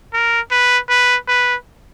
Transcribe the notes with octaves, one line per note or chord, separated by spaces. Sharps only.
A#4
B4
B4
B4